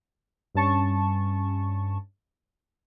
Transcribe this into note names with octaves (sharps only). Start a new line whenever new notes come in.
G2 C#4 A5 C#6